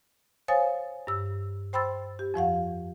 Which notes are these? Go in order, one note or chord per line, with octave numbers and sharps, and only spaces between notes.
C5 C#5 F5 G#5 D#6 A6
G2 E6
C5 G5 B5 C6 E6 A6
G4
F2 F3 F5 F#5